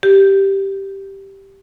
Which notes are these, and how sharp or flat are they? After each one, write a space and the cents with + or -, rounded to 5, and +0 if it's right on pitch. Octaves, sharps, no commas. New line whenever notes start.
G4 -5